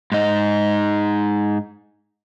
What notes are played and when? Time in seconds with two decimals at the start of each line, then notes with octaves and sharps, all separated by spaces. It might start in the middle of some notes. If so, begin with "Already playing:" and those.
0.12 G#2 D#4